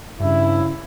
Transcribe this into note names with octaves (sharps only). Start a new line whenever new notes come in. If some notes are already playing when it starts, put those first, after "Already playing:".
G2 C#3 E4